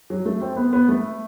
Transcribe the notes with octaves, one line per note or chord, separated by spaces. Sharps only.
F#3
A3
C4
B3
B3
A3